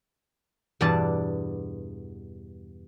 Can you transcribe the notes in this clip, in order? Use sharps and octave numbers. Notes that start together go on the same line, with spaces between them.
E2 G2 B2 D4 D5 A5